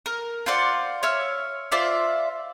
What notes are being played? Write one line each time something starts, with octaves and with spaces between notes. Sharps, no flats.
A#4
F4 C5 D5 F#5
C#5 E5 F6
F4 C5 D5 E5